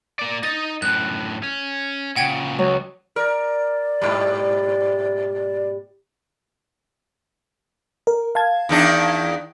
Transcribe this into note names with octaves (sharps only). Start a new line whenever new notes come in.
A#3 D5
D#4 D#5 A6
F#2 A2 F#6
C#4
A#2 C#3 F#5 G5 G#6
C#2 F#3
A#4 D5
G#2 B2 G3
A#4
F5 A5 G#6
E2 D#3 D4